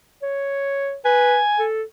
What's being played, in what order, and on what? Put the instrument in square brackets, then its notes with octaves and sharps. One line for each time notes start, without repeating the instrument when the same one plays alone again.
[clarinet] C#5
[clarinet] B4 [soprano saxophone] G#5
[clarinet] A4